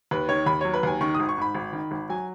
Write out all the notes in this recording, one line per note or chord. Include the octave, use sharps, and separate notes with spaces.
D#2 B4
D#3 C#5
D#2 B5
F#3 C#5
B4
D#2 G#5
D#3 C#6
D#6
G#1
C#6
G#2 B5
G#1
D#3
G#1
F#3 G#5